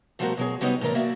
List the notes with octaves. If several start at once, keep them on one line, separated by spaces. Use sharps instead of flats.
B2 F3 G3 A3 F#4 A#4
B2 F#3 G#4
C3 F#3 G3 B3 D#4
A2 E3 A#4 D5
A#3 F#4 D5 E5